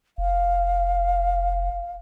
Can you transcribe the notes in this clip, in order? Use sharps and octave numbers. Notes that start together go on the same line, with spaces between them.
F1 F5